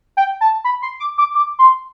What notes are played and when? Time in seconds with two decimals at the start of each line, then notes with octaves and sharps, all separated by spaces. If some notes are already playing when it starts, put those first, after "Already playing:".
0.17 G5
0.41 A5
0.64 B5
0.82 C6
1.00 D6
1.18 D6
1.35 D6
1.59 C6